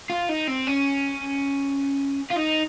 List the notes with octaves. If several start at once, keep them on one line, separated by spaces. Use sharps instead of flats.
F4
D#4
C4
C#4
F4
D#4